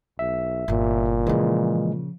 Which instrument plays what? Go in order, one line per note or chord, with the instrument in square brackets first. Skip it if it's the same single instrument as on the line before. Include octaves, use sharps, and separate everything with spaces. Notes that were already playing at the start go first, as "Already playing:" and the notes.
[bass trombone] B1 [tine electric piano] E5
[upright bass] G1 E3 [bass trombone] A#2
[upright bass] C#3 F3 [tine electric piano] E3 G#3